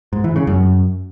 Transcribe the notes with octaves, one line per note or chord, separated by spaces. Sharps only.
G#2
E3
C#3
F#2